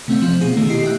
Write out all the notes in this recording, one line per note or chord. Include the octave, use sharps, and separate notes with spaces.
C3 A3 C4
F3 C4 F5
B2 G#4
B2 D#3 A3
E4 G4 D#5 C7
G4 E5 G5 F#6